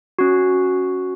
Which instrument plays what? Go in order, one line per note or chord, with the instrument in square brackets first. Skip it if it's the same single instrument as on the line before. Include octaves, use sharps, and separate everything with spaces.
[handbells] C#4 F#4